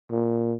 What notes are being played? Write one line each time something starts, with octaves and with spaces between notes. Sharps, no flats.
A#2